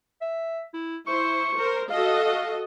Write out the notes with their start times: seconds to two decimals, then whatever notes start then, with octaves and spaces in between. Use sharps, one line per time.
0.22 E5
0.74 E4
1.07 E4 C5 C#6
1.58 A#4 C5
1.90 F#4 A4 D#5 F5